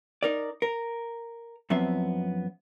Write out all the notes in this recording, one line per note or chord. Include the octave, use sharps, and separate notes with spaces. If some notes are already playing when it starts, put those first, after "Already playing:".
D#4 A#4 D5
A#4
F#2 F3 B3 C4 E5